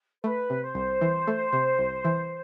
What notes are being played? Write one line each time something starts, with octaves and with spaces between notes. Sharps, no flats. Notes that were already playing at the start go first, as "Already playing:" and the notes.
A3 B4
C3
C5
C2
E3
A3
C3
C2
E3